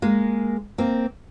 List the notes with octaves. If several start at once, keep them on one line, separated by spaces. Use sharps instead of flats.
G#3 A#3
A#3 C4